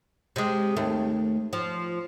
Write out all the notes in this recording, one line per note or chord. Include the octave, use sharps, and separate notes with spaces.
C3 G#3
D#2 A3
F3